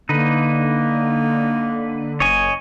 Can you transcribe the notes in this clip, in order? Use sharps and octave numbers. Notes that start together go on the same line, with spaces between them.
D3 A#3 D#4 B4
F#1 C#5 D#5 G#5